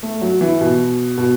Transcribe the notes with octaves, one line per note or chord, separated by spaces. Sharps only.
A3
F#3
E3
B2
B2